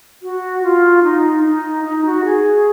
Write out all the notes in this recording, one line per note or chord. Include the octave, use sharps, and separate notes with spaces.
F#4
F4
D#4
D#4
D#4
F#4
G#4